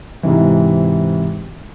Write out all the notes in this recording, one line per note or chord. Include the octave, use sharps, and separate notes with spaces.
G#2 C3 E3